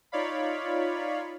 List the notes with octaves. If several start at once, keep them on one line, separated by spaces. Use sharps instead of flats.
D#4 F4 C#5 D5 F5 B5